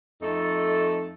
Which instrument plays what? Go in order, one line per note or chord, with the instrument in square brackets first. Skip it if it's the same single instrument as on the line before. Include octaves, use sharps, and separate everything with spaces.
[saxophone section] F2 A3 D#4 A4